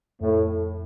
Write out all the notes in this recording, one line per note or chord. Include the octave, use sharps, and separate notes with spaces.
F2 A2